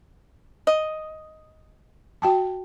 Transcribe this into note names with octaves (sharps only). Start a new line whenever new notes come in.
D#5
F#4 G5 A5